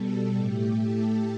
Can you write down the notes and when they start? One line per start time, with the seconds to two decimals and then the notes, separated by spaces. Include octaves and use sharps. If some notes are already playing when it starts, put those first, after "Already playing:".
Already playing: B2 G3 A4
0.37 A2 A3 G4
0.84 A4